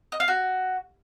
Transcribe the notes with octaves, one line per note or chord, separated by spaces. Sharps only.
D#5
F5
F#4